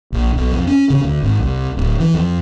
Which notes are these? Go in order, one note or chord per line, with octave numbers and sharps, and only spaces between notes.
A#1
B1
F2
C#4
C#3
D2
G#1
C2
D1
E3
F2